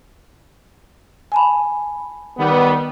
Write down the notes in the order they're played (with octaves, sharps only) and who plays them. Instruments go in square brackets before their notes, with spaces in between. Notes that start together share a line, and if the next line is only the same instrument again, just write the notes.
[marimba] G#5 A5 B5
[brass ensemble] D#3 G3 B3